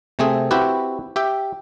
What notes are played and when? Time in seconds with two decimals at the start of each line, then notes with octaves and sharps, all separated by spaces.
0.19 C3 A3 C4 G#4
0.51 C4 E4 F#4 G4 B4
1.16 G4 E5 G5